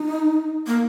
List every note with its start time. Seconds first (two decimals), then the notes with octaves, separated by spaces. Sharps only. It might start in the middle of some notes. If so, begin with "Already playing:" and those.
Already playing: D#4
0.67 A#3